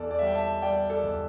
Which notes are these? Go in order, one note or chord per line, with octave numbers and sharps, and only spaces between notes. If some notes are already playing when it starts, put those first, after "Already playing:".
Already playing: E2 A4 D5
D5
G3 E5
G5
E5 A5
G3 D5 G5
A4 D5
E2